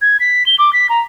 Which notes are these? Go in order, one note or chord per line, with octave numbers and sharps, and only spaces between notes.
G#6
B6
G7
D6
B6
A#5